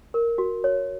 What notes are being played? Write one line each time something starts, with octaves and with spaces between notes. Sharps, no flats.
A#4
F#4
C#5